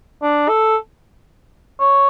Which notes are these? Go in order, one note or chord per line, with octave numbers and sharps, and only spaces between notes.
D4
A4
C#5